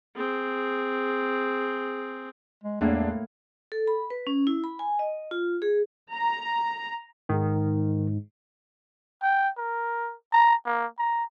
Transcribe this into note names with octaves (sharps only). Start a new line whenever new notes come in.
C4 G#4
G#3
E2 A2 G#3 A#3 D4 E5
A4
B5
B4
C#4
E4
B5
G#5
D#5
F4
G#4
A#5
G#2 D#3
G5
A#4
A#5
A#3
A#5